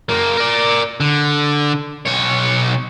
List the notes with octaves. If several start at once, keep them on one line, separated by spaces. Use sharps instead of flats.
F#2 A#3
A#4 D5
D3
B1 C#5